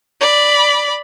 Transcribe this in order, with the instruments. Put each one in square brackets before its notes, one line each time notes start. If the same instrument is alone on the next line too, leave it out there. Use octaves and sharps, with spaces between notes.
[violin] D5 B5